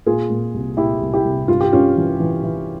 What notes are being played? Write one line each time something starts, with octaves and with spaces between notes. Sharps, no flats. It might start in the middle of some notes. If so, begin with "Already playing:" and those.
A#2 F4 G#4
A#2
C2
A#2 E4 G4
C2
E4 G4
C2
G2 F4
G4
G2 C#4 F4
E3
E3
E3